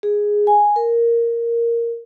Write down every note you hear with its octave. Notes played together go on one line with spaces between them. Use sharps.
G#4
G#5
A#4